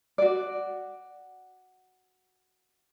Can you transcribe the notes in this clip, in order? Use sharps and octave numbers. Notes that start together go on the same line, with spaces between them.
F#4 D5